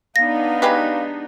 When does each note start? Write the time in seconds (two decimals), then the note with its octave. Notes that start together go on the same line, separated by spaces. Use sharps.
0.16 B3 D4 D#4 F5 A#6
0.62 G#3 G4 B4